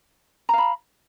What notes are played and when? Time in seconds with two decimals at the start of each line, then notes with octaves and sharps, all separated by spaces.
0.49 A#5
0.53 F5
0.58 B5